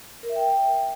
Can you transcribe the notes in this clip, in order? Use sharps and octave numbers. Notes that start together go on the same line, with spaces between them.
A#4
E5
G5